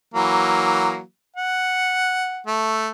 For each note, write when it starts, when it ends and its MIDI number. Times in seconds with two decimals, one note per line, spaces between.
0.14 1.00 52
0.14 1.00 54
0.14 1.00 58
1.36 2.45 78
2.47 2.89 57